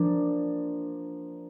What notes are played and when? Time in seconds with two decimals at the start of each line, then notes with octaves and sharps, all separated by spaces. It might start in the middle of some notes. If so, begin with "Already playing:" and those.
Already playing: F3 A#3 D4